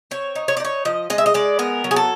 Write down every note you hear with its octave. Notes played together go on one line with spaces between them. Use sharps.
C4 C#5
D#4
C#5
D5
D#4 C#5
F3 D#5
G#3 D#5
E5
D#5
G#3 D5
B3 A#4
F#3
G#4
A4